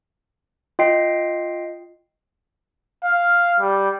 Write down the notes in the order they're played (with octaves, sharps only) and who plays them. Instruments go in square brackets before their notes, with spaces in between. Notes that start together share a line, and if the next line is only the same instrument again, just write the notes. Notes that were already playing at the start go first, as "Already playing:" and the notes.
[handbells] F4 D#5 G5 C7
[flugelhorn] F5
G3